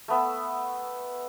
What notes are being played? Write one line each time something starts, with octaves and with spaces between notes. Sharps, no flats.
A3 B3 E5